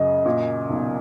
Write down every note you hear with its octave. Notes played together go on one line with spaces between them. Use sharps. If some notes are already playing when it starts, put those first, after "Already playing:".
Already playing: F#2 C#3 D#5
A#2
B1